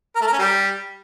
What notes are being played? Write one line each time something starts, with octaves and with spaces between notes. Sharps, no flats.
A#4
A3
A#4
C#4
G3